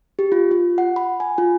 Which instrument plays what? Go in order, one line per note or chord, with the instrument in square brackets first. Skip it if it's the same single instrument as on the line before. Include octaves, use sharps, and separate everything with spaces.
[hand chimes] G4
F4
F4
F#5
B5
G#5
F4